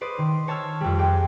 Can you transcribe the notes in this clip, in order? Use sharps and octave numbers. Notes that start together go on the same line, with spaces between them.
B4 C5 D5 D#6
D#3 C6
C5 C#5 A5 E6 F6 G#6
F2 G3
G#4 G5 D6